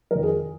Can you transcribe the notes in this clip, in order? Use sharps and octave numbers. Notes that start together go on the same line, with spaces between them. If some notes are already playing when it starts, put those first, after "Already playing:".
F2 D#3 A#4
G#4